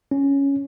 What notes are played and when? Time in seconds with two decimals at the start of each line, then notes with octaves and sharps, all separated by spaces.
0.11 C#4